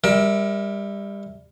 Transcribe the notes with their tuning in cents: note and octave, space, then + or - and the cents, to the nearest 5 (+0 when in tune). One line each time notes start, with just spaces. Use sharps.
G3 +30 A#4 +25 E5 +0